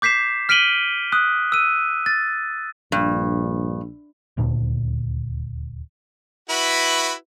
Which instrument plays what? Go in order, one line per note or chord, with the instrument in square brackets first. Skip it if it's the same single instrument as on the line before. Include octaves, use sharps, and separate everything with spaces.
[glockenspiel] D6 G6 B6 C7 E7
F6 B6 D7 D#7 F#7 G7
D#6 F#6
E6 D#7
A6
[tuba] A#1 [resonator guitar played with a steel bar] G2
[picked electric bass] D#1 D2 A#2 D4
[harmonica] E4 F#4 B4